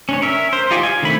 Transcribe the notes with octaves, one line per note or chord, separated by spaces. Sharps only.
C#4 D4 C#5
A#4 E5
C5
D#4 F4 G4 D5 G#5
G#5
D3 D#3 A3 C4 B5